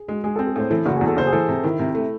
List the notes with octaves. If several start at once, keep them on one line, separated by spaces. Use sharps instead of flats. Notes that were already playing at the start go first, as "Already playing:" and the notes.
Already playing: G#4
G#3 F#4
G#3 G#4
A4
C4
A4
A2 C5
E3 A4
F#1 F#4
E2 G#4
A4
F#1 C5
G#4
E3 A4
C3
D#3 E4
C3
A3